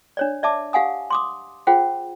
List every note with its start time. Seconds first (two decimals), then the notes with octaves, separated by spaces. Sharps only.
0.17 D4 C#5 D5
0.43 D5 E5 A5 D6
0.73 G4 F5 F#5 G#5 D#6
1.10 C6 D6 D#6
1.67 F4 G#4 C5 F#5 G5